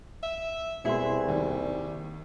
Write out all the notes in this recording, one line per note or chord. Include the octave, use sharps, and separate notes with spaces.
E5
C2 B2 B3 E4 G#4 E5 C6
D#2 G3